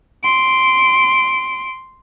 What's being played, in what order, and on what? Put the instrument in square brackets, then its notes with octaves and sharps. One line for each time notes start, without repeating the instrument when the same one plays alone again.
[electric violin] C6 D7